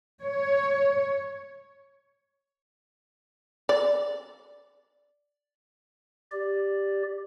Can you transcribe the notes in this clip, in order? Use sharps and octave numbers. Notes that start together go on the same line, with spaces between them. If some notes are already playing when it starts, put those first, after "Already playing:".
C#5
D5
G4 D5